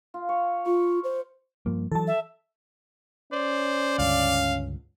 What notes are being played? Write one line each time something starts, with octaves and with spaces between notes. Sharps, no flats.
F4
C#5
F4 C#6
C5
G2 F3 A#3
E3 F#3 A4 A5
E5
C#4 C5 D5
C#2 G2 D3 F5